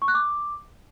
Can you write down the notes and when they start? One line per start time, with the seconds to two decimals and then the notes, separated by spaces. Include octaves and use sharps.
0.02 C#6
0.08 F#6
0.14 D6